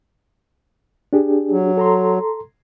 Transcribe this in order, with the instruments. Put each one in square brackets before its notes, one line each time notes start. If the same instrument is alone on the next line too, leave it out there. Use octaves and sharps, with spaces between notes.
[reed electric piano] D4 G4 G#4
[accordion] F#3
[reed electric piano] A4 A#5 C6